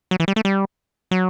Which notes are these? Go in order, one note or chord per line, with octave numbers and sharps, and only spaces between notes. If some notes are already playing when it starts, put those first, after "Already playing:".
F#3
E3
G3
A3
G3
F#3